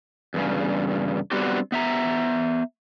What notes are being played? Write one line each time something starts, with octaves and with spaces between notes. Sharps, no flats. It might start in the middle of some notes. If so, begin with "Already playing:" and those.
E2 G2 C#3
G3 B3 C4 D4 F#4 G4
B3 E5 A#5